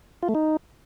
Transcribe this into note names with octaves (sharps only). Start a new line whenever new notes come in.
F4
A3
D#4